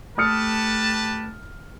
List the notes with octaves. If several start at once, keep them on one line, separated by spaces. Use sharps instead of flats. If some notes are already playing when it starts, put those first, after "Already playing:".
A3 G4 B4 A5 D#6 F6 C#7